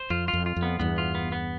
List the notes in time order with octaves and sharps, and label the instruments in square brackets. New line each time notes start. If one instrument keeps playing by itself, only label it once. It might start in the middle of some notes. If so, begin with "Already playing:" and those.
Already playing: [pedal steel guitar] C5
[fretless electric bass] F2 [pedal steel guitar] F4
[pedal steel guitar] F4
[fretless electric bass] F2
[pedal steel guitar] F4
[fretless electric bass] F2
[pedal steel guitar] B3
[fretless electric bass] E2 G2 [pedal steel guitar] B3
[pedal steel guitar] F4
B3
B3